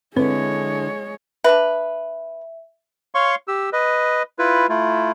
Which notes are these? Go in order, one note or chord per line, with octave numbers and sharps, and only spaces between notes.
D3 G#3 C4 E4 B4 C#5
D4 B4 E5
C#5 F5 C6 C#6
G4 E6
B4 D#5
E4 F4 B4
A3 E4 F4